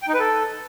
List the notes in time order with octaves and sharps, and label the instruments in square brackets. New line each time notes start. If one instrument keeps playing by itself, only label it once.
[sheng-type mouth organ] G5
D#4
B4
A4